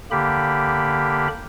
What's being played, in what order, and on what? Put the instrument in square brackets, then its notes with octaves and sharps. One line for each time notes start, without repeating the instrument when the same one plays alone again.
[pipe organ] D3 A#3 G4 B5